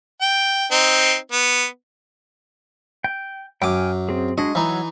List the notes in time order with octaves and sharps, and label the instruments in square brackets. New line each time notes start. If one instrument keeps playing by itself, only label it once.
[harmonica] G5
C4 D#4
B3
[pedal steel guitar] G5
[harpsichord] F#2 D6 [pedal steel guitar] G5 G#5 F6
[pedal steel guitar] C4 G#4
[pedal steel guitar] G#3 D4 F#4 [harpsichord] D#5
[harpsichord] E3 D#4 [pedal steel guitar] F#3 E6